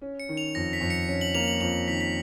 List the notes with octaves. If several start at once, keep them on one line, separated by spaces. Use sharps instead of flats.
C#4
C#7
D#3
F7
F2 A#6
B6
F2
C#7
C#4
F#7
A#3 F7
F#7
F2 F7
D#3 B6
B6